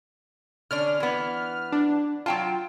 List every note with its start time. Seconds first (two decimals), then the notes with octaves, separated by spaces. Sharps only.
0.71 D3 C#4 D4 F6
1.00 E3 B3
1.72 D4
2.26 F#3 F4 G5 A5